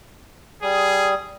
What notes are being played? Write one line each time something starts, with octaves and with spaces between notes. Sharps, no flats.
G3 G#4 D#6